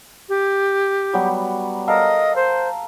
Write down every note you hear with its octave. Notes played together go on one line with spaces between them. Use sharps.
G4
F#3 G3 B3
A4 A#4 D#5 F5
C5